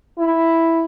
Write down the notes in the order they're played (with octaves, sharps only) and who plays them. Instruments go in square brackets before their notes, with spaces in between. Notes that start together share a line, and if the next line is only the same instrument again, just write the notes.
[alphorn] E4